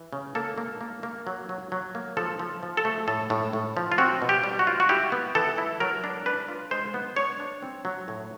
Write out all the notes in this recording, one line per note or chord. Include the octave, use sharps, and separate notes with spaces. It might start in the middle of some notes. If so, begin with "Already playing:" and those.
Already playing: E3
C#3
A#3 A4
A#3
A#3
A#3
F#3
F#3
F#3
A#3
F3 A4
F3
F3
A4
A3
A2 A4
A2
A2
F3
F4
C4 F#4
B2
G4
G3
F#4
F4
F#4
E4 G4
B3
E3 A4
E4
F#3 A#4
D4
D4 B4
F4
G#3 C5
B3
D4 C#5
D4
C4
F#3
A2